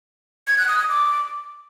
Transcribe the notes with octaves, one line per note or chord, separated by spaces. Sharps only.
G#6
F#6
D#6
D#6
D6